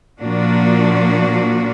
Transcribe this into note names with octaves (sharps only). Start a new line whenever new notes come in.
A#2 F3 A#3 D4 F#4